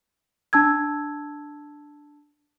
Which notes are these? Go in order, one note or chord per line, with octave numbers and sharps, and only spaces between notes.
D4 A5 E6 G#6